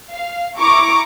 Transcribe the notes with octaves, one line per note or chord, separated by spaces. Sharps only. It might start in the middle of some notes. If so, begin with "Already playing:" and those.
F5
E4 A#5 C#6 D6